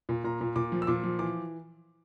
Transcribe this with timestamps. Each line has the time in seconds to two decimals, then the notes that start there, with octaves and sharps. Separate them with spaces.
0.09 A#2
0.24 A#2 A#5
0.41 A#2
0.56 A#2 D6
0.72 F3
0.82 E6
0.87 A#2 D6
1.04 F3
1.19 E3 D6